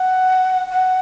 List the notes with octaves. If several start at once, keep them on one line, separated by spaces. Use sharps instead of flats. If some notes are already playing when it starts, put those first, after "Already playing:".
Already playing: F#5
F#5